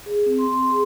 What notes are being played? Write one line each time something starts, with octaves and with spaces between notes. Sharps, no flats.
G#4
C4
C6
C6
G#4